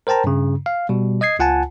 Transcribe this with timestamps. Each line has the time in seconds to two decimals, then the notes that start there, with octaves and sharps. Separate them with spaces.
0.07 A#4 C5 G5 A5 A#5
0.24 G2 C#3
0.66 F5
0.89 B2 G3
1.21 D#5 D#6 G#6 C7
1.39 C#2 F4 F#5 G#5 A5